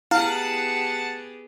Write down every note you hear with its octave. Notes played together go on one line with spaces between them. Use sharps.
B3 E4 G4 G#4 F5 F#5 A5